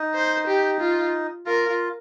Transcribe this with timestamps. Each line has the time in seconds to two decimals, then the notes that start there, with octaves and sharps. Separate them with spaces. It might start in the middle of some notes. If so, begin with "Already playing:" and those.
Already playing: D#4
0.15 C5
0.47 G4
0.80 F4
1.46 F4 A#4
1.69 F4